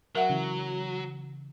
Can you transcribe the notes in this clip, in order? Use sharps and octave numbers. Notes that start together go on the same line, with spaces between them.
F#3 A#4 E5 F#5
C#3 E3